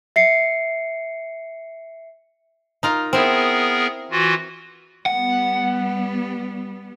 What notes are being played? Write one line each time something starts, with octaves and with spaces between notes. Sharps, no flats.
E5 C7 C#7
D#4 F4 A#4
B3 C4 E4 G#4 A#4
E3 F4 F#4
G3 B3 F#5